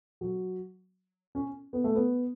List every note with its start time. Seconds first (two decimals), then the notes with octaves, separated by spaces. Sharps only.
0.21 F#3
1.35 C#4
1.73 B3
1.84 A3
1.95 B3